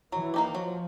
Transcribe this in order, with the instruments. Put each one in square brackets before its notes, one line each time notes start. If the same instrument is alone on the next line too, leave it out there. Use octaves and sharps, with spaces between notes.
[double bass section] E3 [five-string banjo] F#3
[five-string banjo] A#3 D#4 G4
[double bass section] F3 [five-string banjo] F#3